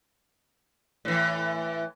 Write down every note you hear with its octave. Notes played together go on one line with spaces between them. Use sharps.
A2 E3